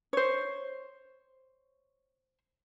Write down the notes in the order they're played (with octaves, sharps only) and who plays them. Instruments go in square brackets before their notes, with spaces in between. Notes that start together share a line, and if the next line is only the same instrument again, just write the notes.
[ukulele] C5 C#5